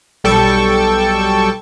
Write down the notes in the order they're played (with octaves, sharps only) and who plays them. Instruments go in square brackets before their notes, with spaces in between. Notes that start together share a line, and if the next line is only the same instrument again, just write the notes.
[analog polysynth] B1 G3 A4 G5 A5 C#6